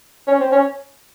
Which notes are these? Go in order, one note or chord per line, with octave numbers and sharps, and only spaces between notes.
C#4
C4
C#4